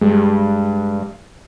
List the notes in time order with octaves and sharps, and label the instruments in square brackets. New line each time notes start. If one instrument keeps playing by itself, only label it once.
[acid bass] G2 [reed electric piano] G3 G#3